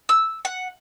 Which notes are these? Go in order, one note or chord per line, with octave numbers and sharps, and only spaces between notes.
E6
F#5